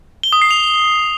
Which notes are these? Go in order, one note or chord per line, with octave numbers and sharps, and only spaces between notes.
G7
D#6
C7
F7